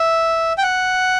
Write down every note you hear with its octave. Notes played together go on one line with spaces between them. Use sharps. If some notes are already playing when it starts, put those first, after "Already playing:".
Already playing: E5
G5
F#5